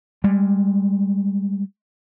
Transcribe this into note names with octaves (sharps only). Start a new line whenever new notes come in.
G3 G#3